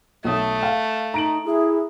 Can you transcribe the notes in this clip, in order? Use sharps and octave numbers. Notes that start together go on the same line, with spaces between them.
B1 A3 D#6
F5
D#4 A#5 D7 F#7
E4 G#4